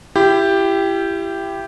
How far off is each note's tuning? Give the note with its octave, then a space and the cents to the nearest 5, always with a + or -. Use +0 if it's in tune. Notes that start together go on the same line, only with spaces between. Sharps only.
E4 +30 G4 +0 G5 +0